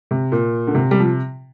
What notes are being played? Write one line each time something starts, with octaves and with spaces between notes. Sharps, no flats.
C3
A#2
D3
C3
G3
F3